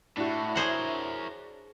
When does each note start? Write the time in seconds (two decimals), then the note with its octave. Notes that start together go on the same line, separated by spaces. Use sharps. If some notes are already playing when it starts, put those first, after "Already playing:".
0.17 A2 D4 E4 F#4
0.56 G#4 A#4 C5 C#5 F#5